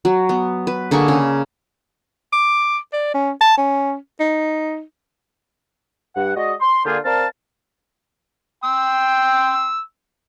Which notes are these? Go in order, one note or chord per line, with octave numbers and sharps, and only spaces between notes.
F#3
B3
B4
D3 A#3 G#4 C#6
C#3
D6
D5
C#4
A5
C#4
D#4
G2 F#5
G#3 F#4 D5 D#5
C6
D3 A#3 D4 F4 G4 G#4
C4 A#4 D5 F5 A5
G5 C6 E6